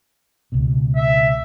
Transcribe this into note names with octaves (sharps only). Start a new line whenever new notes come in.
C#2 B2
E5